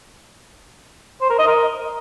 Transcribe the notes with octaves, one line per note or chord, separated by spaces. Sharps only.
C5
A#4
D#5
A#4